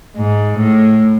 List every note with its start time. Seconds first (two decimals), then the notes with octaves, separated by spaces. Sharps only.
0.17 G#2
0.58 A2